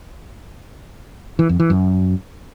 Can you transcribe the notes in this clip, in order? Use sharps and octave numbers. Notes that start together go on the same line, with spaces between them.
E3
F2
E3
F#2